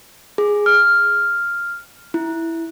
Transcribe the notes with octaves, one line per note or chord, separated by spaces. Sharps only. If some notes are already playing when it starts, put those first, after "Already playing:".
G#4
F6
E4